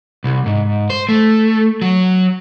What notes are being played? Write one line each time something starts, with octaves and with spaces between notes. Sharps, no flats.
C2
G#2
C5
A3
F#3